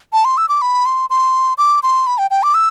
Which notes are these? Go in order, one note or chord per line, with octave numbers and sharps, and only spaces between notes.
A5
C6
E6
D6
B5
C6
C6
D6
C6
B5
G5
G5
D6
E6